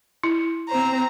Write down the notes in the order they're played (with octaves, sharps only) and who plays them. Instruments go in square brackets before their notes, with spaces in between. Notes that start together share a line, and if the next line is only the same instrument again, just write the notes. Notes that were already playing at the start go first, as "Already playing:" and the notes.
[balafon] E4
[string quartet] C4 C5 A#5